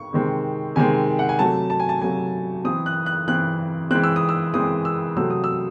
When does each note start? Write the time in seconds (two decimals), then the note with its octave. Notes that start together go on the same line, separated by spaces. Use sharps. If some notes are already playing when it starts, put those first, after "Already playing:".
Already playing: C#6
0.13 C3 D#3 G#3 C4
0.75 C3 D#3 G#3 C4 G#5
1.19 F#5
1.29 G#5
1.39 C3 F#3 A3 A5
1.70 A5
1.80 G#5
1.89 A5
2.02 C3 F#3 A3 G#5
2.64 E3 C4 D#6
2.86 F#6
3.06 F#6
3.28 E3 C4 F#6
3.91 E3 G#3 C4 F#6
4.04 E6
4.16 D#6
4.29 E6
4.54 E3 G#3 C4 D#6
4.85 E6
5.17 C3 F#3 A3 C4 E6
5.30 D#6
5.44 E6